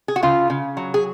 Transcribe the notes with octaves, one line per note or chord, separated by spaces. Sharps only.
G#4
F#4
C#3 F4
C#3
F#3
G#4